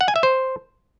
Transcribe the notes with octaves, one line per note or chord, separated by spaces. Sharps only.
F#5
G#5
E5
C5